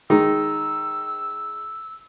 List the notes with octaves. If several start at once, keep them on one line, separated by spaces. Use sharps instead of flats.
D#3 G#3 D#4 E6